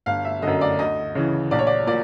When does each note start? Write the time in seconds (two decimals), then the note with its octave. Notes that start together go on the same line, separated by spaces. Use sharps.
0.06 G1 F5
0.25 E5
0.42 F#2 D3 D#5
0.61 D5
0.79 D2 D#5
1.15 C#3 E3
1.51 A#1 D5
1.59 C#5
1.67 D5
1.87 A#2 D5